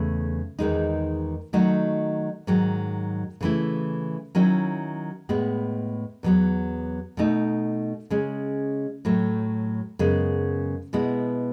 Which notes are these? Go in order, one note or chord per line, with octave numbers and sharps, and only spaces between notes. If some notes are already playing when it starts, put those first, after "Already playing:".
Already playing: E2 C#3 A3
E2 D#3 G#3 D#4
D#3 F#3 A3 D#4 F#4
G#2 D#3 F#3
C#3 E3 A3 E4
D#3 F#3 C#4 E4
A2 G#3 B3
E2 D#3 F#3 B3
B2 A3 D#4
C#3 G#3 C#4
A2 F#3 A3
F#2 C#3 G#3 B3
B2 G#3 B3 E4